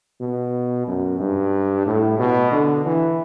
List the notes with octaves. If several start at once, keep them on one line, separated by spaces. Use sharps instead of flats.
B2
F#2
G2
A2
B2
D3
E3